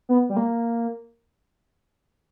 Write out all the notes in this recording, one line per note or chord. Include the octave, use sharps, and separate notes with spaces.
B3
G3
A#3